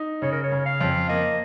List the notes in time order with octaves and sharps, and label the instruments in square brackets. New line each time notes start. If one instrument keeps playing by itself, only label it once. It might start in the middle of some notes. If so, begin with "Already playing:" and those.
Already playing: [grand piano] D#4
[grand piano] C#3 [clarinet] C#5
[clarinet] A#4
C#5
[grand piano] C#3
[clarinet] F5
[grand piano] F2
[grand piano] A#3 [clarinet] D#5